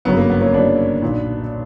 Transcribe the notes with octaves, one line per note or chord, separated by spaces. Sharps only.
G1 F#2 C#3 F#3 B3
A#3
B3
A#3 C#4
G1 F#2 C#3 F#3 B3 D4
B1 A#2 F#3